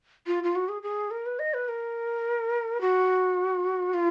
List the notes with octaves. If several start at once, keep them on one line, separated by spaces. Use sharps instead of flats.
F4
F4
F#4
G#4
G#4
A#4
B4
D#5
B4
A#4
F#4
F4